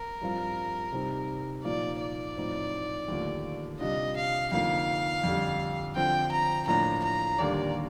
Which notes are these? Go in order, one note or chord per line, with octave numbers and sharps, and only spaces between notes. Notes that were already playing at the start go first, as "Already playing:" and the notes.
Already playing: A#4
G2 F3 C4 F4
C3 G3 C4 D#4
A#2 F3 A#3 D#4 D5
D5
A2 F3 C4 D#4
D#2 D3 F3 A3
C3 G3 D4 F4 D#5
F5
F2 D3 F3 A#3 D#4 F5
F2 D3 G3
D3 F3 C4 G5
A#5
A2 F3 A#3 D4 A#5
A#5
D#2 D3 G3 A#3 D4 D5